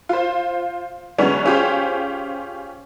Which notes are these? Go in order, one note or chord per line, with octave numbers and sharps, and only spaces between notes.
F4 C5
F#2 D3 G3 G#3 B3 C#4
C#4 F4 G4 G#4 C5